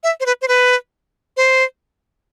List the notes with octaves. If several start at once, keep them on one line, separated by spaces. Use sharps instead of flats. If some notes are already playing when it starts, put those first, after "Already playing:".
E5
C5
B4
C5
B4
C5